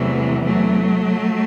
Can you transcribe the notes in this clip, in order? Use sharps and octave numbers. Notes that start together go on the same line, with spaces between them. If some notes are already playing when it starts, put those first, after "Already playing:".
Already playing: E2 C3 E3 F#3 A3
F#3 A3